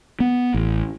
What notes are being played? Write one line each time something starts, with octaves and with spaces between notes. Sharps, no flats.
B3
A1